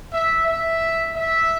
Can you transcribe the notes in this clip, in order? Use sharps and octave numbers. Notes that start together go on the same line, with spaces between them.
E5
E5
E5